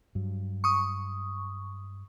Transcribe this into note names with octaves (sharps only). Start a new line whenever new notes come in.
G2 F#3
C#6 D#6